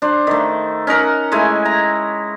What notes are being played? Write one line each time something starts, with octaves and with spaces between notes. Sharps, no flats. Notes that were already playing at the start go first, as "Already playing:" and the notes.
D4 C5
D#3 A3
C#4 D#4 A#4 F#5
G#3 A3 E4 G#5
A#5